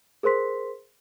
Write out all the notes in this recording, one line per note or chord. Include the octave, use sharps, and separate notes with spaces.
G#4 A#4 C5 C6 B6